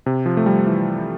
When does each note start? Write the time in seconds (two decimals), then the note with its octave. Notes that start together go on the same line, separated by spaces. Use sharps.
0.06 C3
0.26 F3
0.37 A3
0.46 G3
0.67 E3